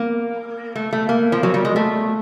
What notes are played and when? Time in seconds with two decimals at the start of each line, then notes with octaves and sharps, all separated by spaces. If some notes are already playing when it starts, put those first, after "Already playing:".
Already playing: A#3
0.76 A3
0.93 A3
1.09 A#3
1.32 F3
1.43 F#3
1.54 G3
1.65 G#3
1.76 A3